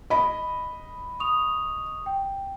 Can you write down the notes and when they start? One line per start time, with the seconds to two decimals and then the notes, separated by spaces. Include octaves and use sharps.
0.10 D#5 B5
1.20 C#6 D#6 F7
2.06 G5